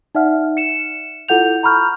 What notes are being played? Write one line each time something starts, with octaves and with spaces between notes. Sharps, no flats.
D#4 D5 E5 F#5 F6
C#7 E7
E4 F4 A4 F#5 G6 F7
A#5 B5 C#6 F6 G6